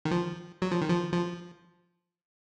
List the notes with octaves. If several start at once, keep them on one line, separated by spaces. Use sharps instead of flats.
D#3
F3
F#3
F3
D#3
F3
F3